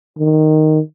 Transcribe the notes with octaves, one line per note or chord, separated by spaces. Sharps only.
D#3